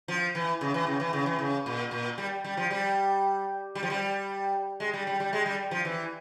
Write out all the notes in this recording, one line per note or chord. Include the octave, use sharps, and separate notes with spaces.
F3
E3
C#3
E3
C#3
E3
C#3
E3
C#3
A#2
A#2
G3
G3
F3
G3
G3
F3
G3
G#3
G3
G3
G3
G#3
G3
F3
E3